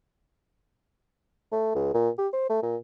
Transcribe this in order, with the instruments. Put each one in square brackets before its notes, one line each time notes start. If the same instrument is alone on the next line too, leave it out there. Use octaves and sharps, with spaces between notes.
[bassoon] A3
C#2
A#2
G4
C5
A3
A#2